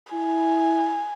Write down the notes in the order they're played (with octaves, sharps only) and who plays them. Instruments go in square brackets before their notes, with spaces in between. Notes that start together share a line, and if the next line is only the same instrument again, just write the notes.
[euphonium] E4 [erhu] G#5